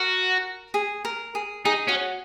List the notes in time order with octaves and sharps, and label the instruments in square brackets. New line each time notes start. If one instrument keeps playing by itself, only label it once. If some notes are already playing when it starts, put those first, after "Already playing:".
Already playing: [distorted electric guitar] F#4 [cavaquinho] A#4
[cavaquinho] G#4
A#4
G#4
[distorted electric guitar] D#4 [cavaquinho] G#4
[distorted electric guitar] C#4 [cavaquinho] F#4